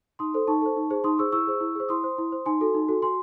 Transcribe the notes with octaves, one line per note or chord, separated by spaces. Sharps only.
D#4 C6 D#6
A4 C5
D#4 A5 C#6
A4 C5
D#4
G#4 C5
D#4 C6 D#6
G#4 C5 C#6 E6
E4 C#6 E6
G#4 C5
E4
G#4 C5
E4 C6 D#6
C5
E4
C5
D#4 G#5 C6
F#4 A4
D#4
F#4 A4
F#4 G#5 C6